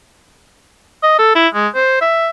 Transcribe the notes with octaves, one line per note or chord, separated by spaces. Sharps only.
D#5
A4
E4
G#3
C5
E5